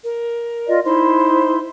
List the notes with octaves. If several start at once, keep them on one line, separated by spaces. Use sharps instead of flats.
A#4
F4 D5 D#5
D#4 E4 C5 C6